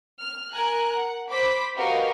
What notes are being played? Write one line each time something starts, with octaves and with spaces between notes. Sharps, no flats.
F6
A#4 G#5 A#5 F#6
F#5
C5 B5 D6 B6
F#4 G4 A#4 B4 D#5 F5